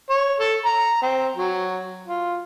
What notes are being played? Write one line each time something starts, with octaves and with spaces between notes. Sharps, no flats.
C#5
A4
A#5
C4
F#3
F4